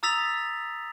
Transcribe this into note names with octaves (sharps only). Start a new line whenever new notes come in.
A#5 D#6 E6 A6 B6 F7